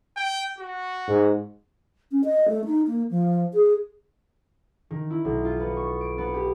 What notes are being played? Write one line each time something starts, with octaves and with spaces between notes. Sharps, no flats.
G5
F#4
G#2
C#4
D#5
A3
D#4
A#3
F3
G#4
D#3
E4
B1
F4
B3
C#6
D7
B3
G4